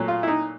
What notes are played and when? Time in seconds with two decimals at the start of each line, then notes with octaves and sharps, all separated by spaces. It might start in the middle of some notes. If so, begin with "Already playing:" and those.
Already playing: A#2 F#3 A3
0.08 F4
0.23 E4
0.28 D#4